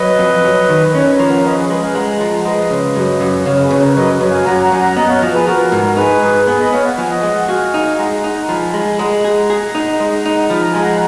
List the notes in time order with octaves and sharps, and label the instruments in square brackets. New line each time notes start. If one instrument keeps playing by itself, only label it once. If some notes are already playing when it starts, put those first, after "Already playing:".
Already playing: [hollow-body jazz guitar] F#3 [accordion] B4 D#5
[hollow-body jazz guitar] F2
F#3
D#3
[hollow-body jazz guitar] C#4 [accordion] C#5
[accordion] B4
[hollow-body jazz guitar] F3 [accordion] A#4 C#5
[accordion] F#5
F5
[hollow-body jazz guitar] C#4 [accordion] B4 D#5
[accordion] G#4 B4
[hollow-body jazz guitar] G#3 [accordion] G#4 B4
[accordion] F5 G#5
[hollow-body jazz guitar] G#3 [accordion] F#5 A#5
[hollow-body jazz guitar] F3
[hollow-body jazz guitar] G#3 [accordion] B4 D#5
[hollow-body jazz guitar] C#3
F#2
F#2
[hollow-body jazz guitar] C#3 [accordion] C#5 F5
[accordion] G#4 B4
[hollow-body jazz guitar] C#3
[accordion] A#4 C#5
[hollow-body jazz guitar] F#2 [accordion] B4 D#5
[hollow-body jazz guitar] F#2
[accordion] F5 G#5
[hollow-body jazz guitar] F#2 [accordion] F#5 A#5
[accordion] F#5 A#5
[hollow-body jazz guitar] F#2 [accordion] G#5
[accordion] F#5 A#5
[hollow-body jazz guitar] B3 [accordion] D#5 F#5
[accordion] C#5 F5
[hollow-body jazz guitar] F3
[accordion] G#4 B4
[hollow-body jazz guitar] F3 [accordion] F#4 A#4
[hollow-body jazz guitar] G#2
[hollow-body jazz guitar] D#4 [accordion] G#4 B4
[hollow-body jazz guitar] G#2
[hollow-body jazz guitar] B3 [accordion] G#4 B4
[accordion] B4 D#5
[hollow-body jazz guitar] B3 [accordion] C#5 F5
[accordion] F#5
[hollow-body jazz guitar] F3 [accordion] G#5
[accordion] D#5 F#5
[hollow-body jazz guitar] G#3
[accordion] F#5
[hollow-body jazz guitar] F#4 [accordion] F5 G#5
[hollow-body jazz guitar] D#4
[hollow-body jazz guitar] G#3 [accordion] F#5 A#5
[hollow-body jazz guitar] D#4
[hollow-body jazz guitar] F3 [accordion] G#5 B5
[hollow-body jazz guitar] G#3
[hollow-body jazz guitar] G#3 [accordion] F#5 A#5
[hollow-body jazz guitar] G#4
G#4
D#4
G#3
D#4
[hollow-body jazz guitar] F3 [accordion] B5
[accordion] A#5
[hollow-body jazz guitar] G#3 [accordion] G#5
[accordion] F#5 A#5